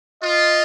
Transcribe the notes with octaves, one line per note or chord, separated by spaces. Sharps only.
F4 D#5